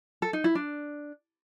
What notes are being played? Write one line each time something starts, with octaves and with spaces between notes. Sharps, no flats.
A4
D#4
E4
D4